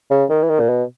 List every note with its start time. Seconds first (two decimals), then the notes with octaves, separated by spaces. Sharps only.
0.11 C#3
0.30 D#3
0.43 E3
0.50 D#3
0.60 A#2
0.69 B2